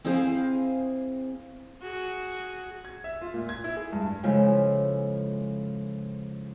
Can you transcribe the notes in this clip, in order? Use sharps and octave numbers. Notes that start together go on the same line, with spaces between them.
C4 E4 G#4 C5 F5 G#5
F#4 G#4
G#6
E5
F4
A#2
G#6
E4
G#4
G2
C#3 F3 G#3 E4 F4 A4